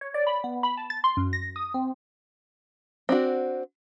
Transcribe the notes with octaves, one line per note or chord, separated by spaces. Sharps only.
C#5
D5
B5
B3
B5
A5
A6
C6
F#2
A#6
D#6
C4
C4 D4 F#4